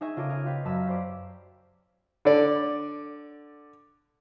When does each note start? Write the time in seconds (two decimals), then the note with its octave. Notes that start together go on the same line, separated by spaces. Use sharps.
0.01 D#4 G#4 D#5 E5 G#5 C#6
0.16 C#3 F4 A4 A#4 D6 D#7
0.30 D#5 F6 G#6
0.45 F4 G4 B4 F5 G5 C6
0.65 F#2 A#4 A5 B5 E6
0.86 G4 C5 D5
2.25 D3 D5